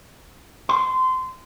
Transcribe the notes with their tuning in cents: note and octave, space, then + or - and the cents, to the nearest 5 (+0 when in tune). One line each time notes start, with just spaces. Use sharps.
C6 -20